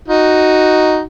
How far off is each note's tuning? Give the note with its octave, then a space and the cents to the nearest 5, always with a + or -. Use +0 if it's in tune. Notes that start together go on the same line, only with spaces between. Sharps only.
D#4 +0 F#4 +0